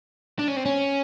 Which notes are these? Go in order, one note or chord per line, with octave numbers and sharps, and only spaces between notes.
D4
C#4
C4
C#4